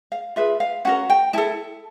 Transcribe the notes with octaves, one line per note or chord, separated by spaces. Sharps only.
F5
F4 G#4 B4 E5
F5
C#4 F#4 A#4 F#5
G5
E4 A4 A5